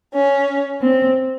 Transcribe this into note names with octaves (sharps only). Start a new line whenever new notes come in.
C#4
C4